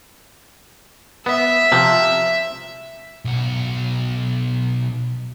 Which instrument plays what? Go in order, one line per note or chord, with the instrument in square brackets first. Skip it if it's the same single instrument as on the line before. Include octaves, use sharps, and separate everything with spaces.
[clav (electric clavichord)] B3 [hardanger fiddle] E5
[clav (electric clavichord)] C3 F3
[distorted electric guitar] B1 F#4